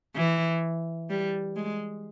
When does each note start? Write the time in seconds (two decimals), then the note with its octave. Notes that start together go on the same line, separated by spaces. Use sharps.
0.16 E3
1.10 G3
1.56 G#3